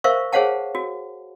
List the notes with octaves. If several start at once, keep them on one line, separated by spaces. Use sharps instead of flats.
A#4 C5 E5 F5 C#6
G#4 C5 C#5 F5 F#5 A5
F#4